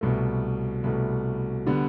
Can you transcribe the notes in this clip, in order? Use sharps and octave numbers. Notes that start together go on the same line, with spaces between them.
C2 B2 A3
C2 B2 A3
D3 G3 B3